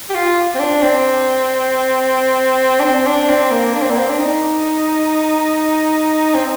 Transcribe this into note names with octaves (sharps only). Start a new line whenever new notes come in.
G4
F4
C4
D4
C4
D4
C4
D4
C4
A#3
D4
C4
A#3
C4
D4
D#4
C4